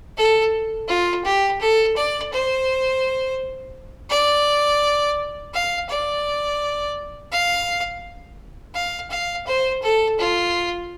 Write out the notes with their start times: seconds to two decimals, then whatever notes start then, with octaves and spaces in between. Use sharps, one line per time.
0.18 A4
0.88 F4
1.25 G4
1.61 A4
1.96 D5
2.32 C5
4.10 D5
5.54 F5
5.90 D5
7.32 F5
8.75 F5
9.10 F5
9.47 C5
9.83 A4
10.19 F4